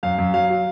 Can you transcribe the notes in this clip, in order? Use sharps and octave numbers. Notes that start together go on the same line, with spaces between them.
F#2 F5
F#2
F#3 F5
F#3